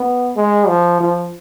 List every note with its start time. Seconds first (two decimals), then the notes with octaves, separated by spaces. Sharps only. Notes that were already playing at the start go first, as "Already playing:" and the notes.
Already playing: B3
0.37 G#3
0.68 F3
1.01 F3